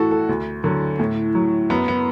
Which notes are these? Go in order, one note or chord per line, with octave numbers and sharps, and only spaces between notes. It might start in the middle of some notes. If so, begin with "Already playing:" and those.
Already playing: A2 E3 E4 F#4 A4
A4
D2
D3 F#3
A2
F#3
F#2 B3
B3